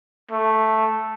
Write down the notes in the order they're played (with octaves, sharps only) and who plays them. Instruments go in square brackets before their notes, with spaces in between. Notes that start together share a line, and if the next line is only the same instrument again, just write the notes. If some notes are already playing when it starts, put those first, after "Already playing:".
[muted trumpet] A3